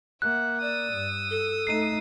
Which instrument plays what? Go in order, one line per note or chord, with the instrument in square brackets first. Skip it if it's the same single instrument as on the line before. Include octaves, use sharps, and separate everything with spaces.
[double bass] A#3 [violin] E5 F#5 [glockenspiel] F#6
[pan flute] D5 [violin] D#6 E6
[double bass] G2
[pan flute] A4
[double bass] A3 D#4 [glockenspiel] C7 D#7